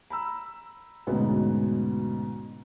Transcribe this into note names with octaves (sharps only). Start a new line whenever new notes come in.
A#5 B5 E6
D2 G#2 B2 B3 C#4 D#4